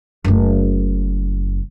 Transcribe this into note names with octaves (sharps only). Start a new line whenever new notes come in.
F#1 A3